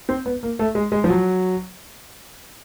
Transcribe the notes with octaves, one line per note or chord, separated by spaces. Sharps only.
C4
B3
A#3
A3
G#3
G#3
F3
F#3